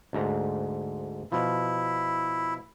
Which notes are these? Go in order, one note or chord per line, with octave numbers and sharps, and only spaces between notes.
D2 G#2 A#5
B2 F3 E4